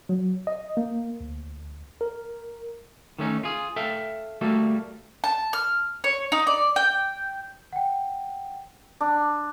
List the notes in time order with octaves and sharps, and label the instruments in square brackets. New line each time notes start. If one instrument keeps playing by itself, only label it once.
[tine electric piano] F#3
D#5
A#3
D2
A#4
[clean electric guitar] D#3 A3 C#4 D#4
F4 G#4
A4 E5 F5 G5
G3 A3 A#3 F#4 A4
[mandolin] A5
F6
C#5
D#4
D5
G5
[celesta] F#5 G5
[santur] D4